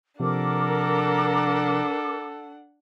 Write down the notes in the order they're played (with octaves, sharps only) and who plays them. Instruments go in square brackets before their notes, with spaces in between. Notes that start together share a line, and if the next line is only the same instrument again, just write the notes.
[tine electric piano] C3 F3 [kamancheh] D4 F#5 [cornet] A4 [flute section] A#4 D6